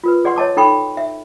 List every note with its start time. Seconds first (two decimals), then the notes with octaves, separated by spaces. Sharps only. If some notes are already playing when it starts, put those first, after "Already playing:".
0.04 F4 A#4 B4
0.25 G#4 D5 F#5 C6 C#6
0.36 C#5 D#5 A5 D6
0.57 D#4 A4 G5 B5 C#6
0.97 E5